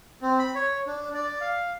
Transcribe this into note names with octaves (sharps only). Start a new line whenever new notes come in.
C4
B5
C#5
D4
D5
F5